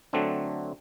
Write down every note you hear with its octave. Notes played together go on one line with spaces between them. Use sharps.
D3 F#3 A3 C4 D4